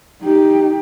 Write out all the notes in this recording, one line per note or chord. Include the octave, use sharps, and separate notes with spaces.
D#4 G4